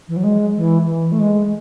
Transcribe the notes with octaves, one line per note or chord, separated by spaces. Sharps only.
E3
F#3
G#3
E3
E3
A3
G#3